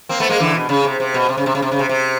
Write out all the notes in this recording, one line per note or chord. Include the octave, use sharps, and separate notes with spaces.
A#3 C4
A3 B3
G#3 A#3
D3 E3
B2
C#3
C3
C3
B2
C3
C#3
C3
C#3
C3
C#3
C3
C3